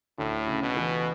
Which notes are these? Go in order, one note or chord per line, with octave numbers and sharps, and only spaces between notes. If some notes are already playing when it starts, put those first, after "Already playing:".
D2 A2
C#3
B2
E3